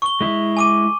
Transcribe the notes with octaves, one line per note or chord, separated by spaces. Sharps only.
C#6 G7
G#3 E4
G#5 D6 D#7